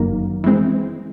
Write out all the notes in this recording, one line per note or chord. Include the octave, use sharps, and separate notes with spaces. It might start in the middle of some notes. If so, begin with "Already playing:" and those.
Already playing: G1 F#2 D#3 F#3 A#3
E3 G#3 C4